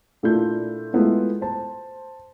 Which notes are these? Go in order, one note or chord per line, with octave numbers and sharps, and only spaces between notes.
A#2 A3 D4 E4 F4 G6
G#3 A3 B3 E4 F4
C5 A5